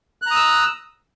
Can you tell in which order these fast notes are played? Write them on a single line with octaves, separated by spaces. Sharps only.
F#6 A#5 D#6 E6